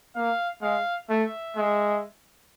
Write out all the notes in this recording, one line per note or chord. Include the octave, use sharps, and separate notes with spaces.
A#3 F5
G#3 F5
A3 E5
G#3